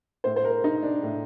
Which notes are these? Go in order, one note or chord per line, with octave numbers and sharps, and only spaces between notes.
A2 C5
C5
A#4
D#4
D4
A2